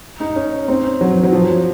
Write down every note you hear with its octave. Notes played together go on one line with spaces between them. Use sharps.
D#4
C#4
C4
F#3
F#3
F3